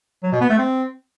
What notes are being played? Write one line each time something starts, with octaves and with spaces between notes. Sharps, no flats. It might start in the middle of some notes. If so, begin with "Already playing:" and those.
F#3
B2
B3
A3
C4